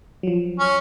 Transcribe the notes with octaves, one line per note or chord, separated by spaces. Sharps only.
F3 F#3
C#4